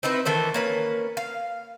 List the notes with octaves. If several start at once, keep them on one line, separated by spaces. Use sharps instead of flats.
C4 D#4 E4 B4
D#3 E3 A3 C5
A#3 C#4 B4
F5